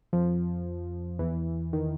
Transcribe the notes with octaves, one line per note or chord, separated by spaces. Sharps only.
F2 F3
E2 E3
D#3